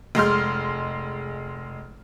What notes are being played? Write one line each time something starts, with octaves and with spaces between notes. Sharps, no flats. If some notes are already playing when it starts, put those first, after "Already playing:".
F1 G#3 C6 F6